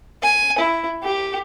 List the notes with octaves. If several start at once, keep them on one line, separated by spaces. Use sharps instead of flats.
G#5
E4
G4